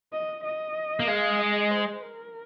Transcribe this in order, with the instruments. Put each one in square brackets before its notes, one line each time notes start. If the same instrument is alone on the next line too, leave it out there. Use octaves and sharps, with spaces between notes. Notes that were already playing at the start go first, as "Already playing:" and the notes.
[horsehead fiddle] D#5
D#5
[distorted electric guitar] A#3
[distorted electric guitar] G#3 [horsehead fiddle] F5
[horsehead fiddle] D#5
C5
A#4